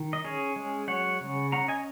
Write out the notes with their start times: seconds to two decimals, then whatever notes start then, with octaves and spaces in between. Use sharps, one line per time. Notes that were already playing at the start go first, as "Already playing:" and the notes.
Already playing: D#3
0.13 D#5
0.24 C#4 G#4 C#5
0.56 G#3
0.88 F#3 C#5 F#5
1.21 C#3
1.52 C#4 F#5 A#5
1.68 D#5 G#5